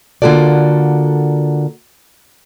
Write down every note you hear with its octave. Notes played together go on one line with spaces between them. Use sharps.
D3 A#3 F4 F#4 A4 D5